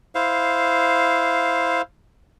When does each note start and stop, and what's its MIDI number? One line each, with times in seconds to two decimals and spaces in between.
0.15 1.82 64
0.15 1.82 72
0.15 1.82 77